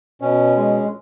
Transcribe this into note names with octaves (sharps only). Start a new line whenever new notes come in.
B2 C#4
G#3